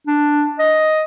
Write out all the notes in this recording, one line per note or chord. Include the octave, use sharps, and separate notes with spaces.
D4
D#5